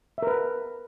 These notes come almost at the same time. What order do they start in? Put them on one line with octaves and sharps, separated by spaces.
E5 A#4 B4